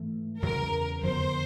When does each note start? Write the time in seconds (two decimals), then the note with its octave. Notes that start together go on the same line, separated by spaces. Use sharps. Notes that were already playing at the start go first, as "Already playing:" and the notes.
Already playing: G#2 E3 A3
0.42 E2 C#3 F#3 A#4
1.03 F2 D3 F#3 B3 C5